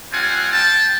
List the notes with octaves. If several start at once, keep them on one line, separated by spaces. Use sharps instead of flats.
G3 C4 F4 F#5 G#5
G5 A5